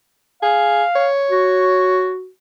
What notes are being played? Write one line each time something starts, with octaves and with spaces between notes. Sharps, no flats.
G#4 F5
C#5
F#4